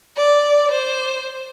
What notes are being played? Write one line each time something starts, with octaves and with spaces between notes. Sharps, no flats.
D5
C5